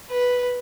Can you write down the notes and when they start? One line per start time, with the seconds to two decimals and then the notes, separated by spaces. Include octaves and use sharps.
0.10 B4